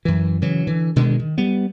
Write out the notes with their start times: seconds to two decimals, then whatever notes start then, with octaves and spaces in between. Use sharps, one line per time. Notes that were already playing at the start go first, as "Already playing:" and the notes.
0.05 F#2 E3
0.42 C#3 E3 F#3
0.67 D3 E3
0.96 B2 D3 D#3 G#3
1.19 D#3
1.38 G3 B3